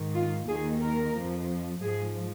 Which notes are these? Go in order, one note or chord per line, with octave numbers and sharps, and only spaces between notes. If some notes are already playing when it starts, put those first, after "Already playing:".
Already playing: G#2 D#3
F4
D#2 D#3 G#4
A#4
F2 F3
G#2 F3 G#4